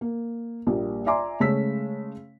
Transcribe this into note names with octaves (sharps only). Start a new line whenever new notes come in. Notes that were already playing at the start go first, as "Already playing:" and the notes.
A#3
A#1 G3 A#3
D5 E5 G#5 A#5 C6 D6
C#3 G#3 A3 C#4 E6 B6